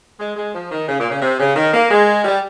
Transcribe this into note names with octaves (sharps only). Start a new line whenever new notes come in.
G#3
G#3
F3
D#3
C#3
A#2
C#3
C3
C#3
D#3
A#3
G#3
G3